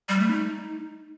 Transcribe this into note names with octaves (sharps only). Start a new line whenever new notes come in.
G3
A3
D#4